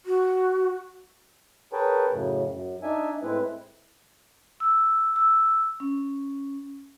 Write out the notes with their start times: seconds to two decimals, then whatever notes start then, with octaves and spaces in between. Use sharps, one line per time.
0.06 F#4
1.73 G#4 A#4 B4 C#5 G5 A5
2.11 F#2 A2 C#3
2.51 F#2
2.83 D4 D#4 E5 G#5
3.22 A2 G#3 C4 E4 B4
4.60 E6
5.16 E6
5.80 C#4